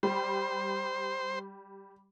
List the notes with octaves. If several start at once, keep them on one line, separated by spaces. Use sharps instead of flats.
G3 C5